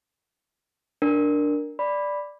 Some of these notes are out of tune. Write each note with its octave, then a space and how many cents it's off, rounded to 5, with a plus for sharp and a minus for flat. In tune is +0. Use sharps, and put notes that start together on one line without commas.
D4 +0 A#4 +0
D5 +0 B5 +0